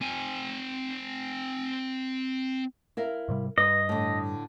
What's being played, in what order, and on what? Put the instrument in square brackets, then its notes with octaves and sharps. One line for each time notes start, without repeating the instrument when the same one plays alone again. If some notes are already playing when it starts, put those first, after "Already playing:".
[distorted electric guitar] C4 G#5
[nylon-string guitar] E4 A#4 F5
[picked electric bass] G#2 C3 G3
[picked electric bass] G2 [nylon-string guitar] B4 [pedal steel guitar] D#5
[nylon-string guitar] A2 D3